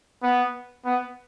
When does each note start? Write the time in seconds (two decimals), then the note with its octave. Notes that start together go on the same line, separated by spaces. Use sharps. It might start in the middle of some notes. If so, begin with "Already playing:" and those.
0.23 B3
0.86 B3